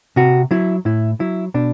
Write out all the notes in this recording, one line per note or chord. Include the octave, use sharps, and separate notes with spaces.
C3 F#4
F#3 E4
A2 E4
F#3 E4
B2 D4